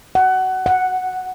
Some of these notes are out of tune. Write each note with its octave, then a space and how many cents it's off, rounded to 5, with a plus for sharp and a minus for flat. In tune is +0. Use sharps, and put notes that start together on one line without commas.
F#5 +20
F#5 +0